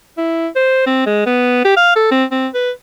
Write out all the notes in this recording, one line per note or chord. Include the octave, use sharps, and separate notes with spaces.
E4
C5
C4
G#3
B3
G4
F5
A4
C4
C4
B4